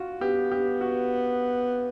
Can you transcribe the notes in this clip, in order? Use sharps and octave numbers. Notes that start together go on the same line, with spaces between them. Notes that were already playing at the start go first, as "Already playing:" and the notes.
Already playing: F4 F#4
B3 G4
G4
F#4